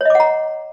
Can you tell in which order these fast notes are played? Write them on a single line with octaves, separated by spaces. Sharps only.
C#5 D#5 D6 F#5 A#5